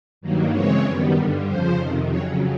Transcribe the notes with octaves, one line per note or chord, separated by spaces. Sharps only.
G2 D#3 F#3 A#3
C#3 E3 G#3 C4 C#5
F#2 D#3 G3 B3
G2 D3 G3
F2 C#3 F3 C5
F2 C3 D#3
F2 C#3 F#3 C#5